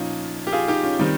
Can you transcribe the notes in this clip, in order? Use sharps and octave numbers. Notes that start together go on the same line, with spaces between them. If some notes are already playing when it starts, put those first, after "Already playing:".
Already playing: A#2 F3 C#4 D#4 F4
G4
F4 G#4
D#4 G4
C#4 F4
D#3 G3 C4 D#4